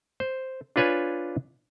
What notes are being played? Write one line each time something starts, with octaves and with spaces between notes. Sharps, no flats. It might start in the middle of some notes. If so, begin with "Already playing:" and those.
C5
D4 F4 B4 C#5 G#5